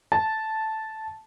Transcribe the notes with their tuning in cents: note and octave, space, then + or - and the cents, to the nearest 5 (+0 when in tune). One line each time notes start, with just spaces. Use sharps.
A5 -5